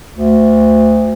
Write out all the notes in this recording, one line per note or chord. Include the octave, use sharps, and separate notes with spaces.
D2